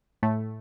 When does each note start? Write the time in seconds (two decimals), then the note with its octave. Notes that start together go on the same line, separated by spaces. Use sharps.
0.23 A2 A3